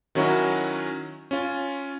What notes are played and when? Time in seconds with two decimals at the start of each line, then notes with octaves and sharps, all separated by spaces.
0.15 D#3 F#3 C#4 E4 F#4
1.31 C#4 F4